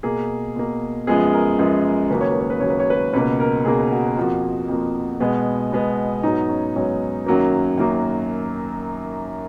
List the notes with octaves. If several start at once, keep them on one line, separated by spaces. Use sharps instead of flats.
B2 A#3 G#4
B2 A#3
F#2 F3 G#3 B3 G#4
A#4
F#2 F3 G#3 B3
D#2 C#3 F#3 A#3 B4
C#5
B4
C#5
B4
D#2 C#3 F#3 A#3 C#5
B4
C#5
B4
C#2 B2 A#3 B4
A#4
C#2 B2 A#3 G#4
F#4
F2 F3 A#3 F#4
F2 F3 A#3
B2 G#3 B3
B2 G#3 B3
G#2 F#3 B3 D#4
C#4
G#2 F#3 B3 C#4
F#2 D#3 F#3 A#3
F#2 D#3 F#3 A#3